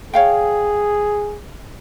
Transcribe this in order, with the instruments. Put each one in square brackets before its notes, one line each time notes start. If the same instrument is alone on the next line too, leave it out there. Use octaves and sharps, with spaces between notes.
[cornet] G#4 [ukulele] C#5 F5 G5